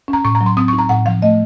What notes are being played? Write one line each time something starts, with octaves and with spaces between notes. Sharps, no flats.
C#4
A#5
A2 C#6
A#5
F#3
C6
C4 D#6
C#6
D#4
A#5
A2 F#5
F3 F5
A3 D#5